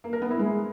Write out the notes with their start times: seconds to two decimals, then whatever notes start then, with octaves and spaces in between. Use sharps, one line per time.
0.04 A#3
0.13 A#4
0.22 B3
0.31 E4
0.39 G#3